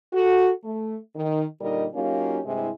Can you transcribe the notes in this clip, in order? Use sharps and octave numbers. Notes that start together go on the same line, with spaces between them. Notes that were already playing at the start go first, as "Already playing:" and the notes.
F#4 A4
A3
D#3
A#2 D3 G3 D#4 A#4 D#5
F#3 A#3 C#4 D#4 F4 G4
G2 C3 G#3 E4